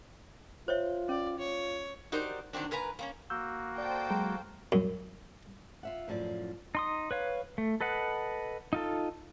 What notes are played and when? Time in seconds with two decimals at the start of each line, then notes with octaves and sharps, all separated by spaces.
0.68 F4 C5 C#5 E5
1.09 C#4 D5
1.39 F4 C#5
2.12 D#4 F#4 G4 A#4 C5 D5
2.53 D#3 F#3 A#3 C4 D4
2.71 A#2 A#4 B4 G#5 A#5
2.99 A#3 C4 C#4
3.30 A#3 F#4 E6 G6
3.78 A4 C5 D5 G5
4.10 F#3 G#3 A#5
4.72 F#2
5.83 F4 E5 F#5
6.08 F#2 A2 F3 D5
6.75 D#4 C6 D#6
7.11 B4 C#5 F5
7.58 A3
7.81 A4 B4 D#5 F#5
8.73 D#4 F4 A4